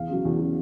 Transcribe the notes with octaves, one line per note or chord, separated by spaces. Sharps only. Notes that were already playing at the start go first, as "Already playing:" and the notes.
Already playing: E2 F5
C#3 F#3
E2
C#3 F#3